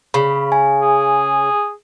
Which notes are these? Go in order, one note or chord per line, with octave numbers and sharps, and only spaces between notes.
C#3 B5
G#5
G#4